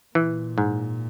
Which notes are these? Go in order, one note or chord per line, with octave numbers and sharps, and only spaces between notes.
A#2 E3
G#2